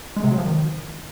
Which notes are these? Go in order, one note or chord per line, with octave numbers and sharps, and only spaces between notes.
G#3
C3
F#3
F3
D#3